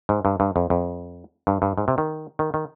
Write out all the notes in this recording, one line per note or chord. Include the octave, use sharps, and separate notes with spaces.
G#2
G2
G2
F2
F2
G2
G2
G#2
C3
D#3
D#3
D#3